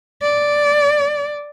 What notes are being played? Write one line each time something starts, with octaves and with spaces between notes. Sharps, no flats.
D5